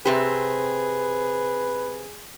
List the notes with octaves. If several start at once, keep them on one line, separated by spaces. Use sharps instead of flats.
C3 C4 G4 G#4 B4